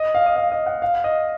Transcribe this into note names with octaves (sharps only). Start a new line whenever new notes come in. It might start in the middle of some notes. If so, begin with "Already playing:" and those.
Already playing: D#5
F5
D#5
F5
D#5
F#5
F5
D#5